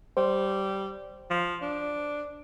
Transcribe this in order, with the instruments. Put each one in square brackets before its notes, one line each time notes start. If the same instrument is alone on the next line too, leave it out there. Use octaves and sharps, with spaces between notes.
[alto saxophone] G3 [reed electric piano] C5
[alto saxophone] F3
D4